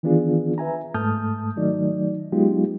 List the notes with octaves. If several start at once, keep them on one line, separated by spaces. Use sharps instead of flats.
D#3 E3 B3 D4 F4 G#4
B4 E5 G#5 A#5
G#2 A3 A5 D#6 F6 G6
D#3 F#3 A3 D#4 D5
F#3 G#3 B3 D#4 F4 G4